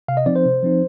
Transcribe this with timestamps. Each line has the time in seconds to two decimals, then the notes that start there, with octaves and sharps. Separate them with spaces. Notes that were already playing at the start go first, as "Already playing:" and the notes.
0.08 C3 F5
0.17 D#5
0.26 F3 C4 D#4 D5
0.36 C5
0.45 C3
0.63 F3 C4 D#4